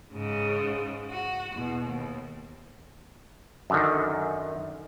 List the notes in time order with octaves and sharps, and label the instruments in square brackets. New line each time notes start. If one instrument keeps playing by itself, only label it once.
[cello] G#2 C#3
F#4
E2 B2
D#2
[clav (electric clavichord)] F#2 D3 D#3